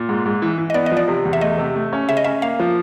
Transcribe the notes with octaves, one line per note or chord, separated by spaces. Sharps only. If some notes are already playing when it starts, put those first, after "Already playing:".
Already playing: A#2
G#2
G#2
E3
E3
D#5
B3 D5
D#5
F3
D5
C3
E2
E5
A3 D#5
C3
A3
C#4
C#3 E5
D#5
C#4 E5
A#3 F5
F3